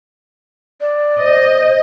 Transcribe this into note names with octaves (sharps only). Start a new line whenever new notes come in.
D5
C5 D#5